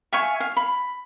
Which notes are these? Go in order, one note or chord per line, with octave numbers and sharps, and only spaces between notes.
E5 F5 G#5 C#6
F5
B5